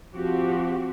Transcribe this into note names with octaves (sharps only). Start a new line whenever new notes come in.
F3 C4 F#4 G4